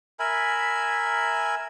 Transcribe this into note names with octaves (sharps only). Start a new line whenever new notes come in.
A#4 E5 G#5 B5